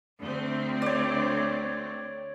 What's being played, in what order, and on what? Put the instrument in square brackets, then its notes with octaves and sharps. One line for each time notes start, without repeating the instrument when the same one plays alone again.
[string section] D2 C4
[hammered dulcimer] C#5 D5